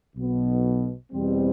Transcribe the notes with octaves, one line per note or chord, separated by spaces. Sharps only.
B1 B2 B3
E2 B2 G3 C4